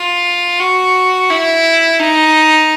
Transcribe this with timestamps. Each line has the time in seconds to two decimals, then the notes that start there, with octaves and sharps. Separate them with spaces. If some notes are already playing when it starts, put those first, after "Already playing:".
Already playing: F4
0.60 F#4
1.30 E4
2.00 D#4